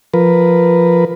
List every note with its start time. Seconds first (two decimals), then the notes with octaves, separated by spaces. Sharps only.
0.14 F3 A#4 B4